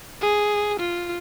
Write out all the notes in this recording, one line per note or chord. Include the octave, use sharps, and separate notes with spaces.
G#4
F4